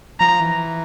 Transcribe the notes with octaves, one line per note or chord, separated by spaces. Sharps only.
F3 A#5
E3